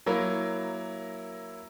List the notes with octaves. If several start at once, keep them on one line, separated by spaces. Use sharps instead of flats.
F#3 A#3 E4 A#4